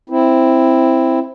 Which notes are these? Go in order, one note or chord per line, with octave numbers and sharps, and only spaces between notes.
C4 E4